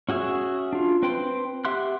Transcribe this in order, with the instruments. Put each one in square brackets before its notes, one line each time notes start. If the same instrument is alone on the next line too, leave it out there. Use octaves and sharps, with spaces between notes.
[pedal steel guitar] C#4 F#4 G#4 E5 C#6
D4 F4
C4 B4 C5 G5 C6
G4 E5 F#5 C6 F#6